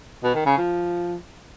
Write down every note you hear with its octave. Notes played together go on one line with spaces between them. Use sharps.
B2
D#3
C#3
F3